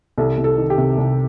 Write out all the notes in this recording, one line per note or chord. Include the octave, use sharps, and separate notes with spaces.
C2 A4
C2
A4
D#3
G4
C3
C2